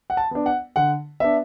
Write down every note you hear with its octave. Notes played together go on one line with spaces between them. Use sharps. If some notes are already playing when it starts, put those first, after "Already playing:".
F#5
A5
B3 D4
F#5
D3 F#5
B3 D4 E5